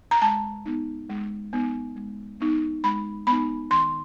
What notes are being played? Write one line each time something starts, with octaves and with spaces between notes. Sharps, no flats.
A#5
G#3 A5
B3 D#4
G#3
B3 D#4
G#3
B3 D#4
G#3 B5
B3 D#4 B5
D#3 C6